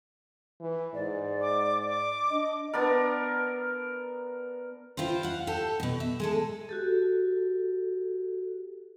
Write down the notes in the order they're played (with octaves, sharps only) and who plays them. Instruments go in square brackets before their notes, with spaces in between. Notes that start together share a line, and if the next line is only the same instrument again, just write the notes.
[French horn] E3
[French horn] G#2 [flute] D5
[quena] D6
D6
[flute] D4 [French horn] D#5
[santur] B3 D4 A#4
[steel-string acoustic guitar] E4 F4 G4 C5
F5 F#5
G4 A4
D2 B2
E5
G#3 G#4 A4
[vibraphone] F#4 G4 A4